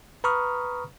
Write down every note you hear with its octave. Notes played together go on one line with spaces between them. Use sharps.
B4 A#5 B5 C#6 D#6 F6